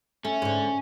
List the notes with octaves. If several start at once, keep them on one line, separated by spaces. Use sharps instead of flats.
A3 C#4
G#2 D3